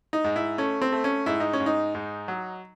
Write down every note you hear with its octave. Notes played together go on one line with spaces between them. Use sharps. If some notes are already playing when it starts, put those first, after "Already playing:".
D#4
G#2
E4
A3 C#4
C4
A3
C#4
G#2 E4
D#4
C#4
G#2
D#4
G#2
F#3